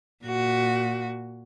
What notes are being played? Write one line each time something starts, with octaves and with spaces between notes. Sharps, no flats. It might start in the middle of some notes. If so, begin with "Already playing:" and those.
A#2 F#4